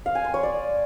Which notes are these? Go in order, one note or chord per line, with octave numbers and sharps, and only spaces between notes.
F5
G#5
C6
C#5
D5